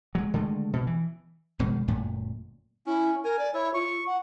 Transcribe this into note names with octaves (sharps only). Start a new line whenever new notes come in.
F#3 G#3
D3 D#3 G#3 A3
B2
E3
F1 B2 D#3 G#3
G1 F#2 A#2 A3
C#4 E4
A#4 G#5
D5
E4 C#5
F4 C#6
F#5